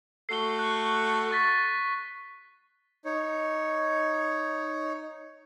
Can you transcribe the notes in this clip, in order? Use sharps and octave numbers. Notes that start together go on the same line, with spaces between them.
A3 F#4 A4 C7 G7
F#6 G7
C#6 A6 B6
D#4 C#5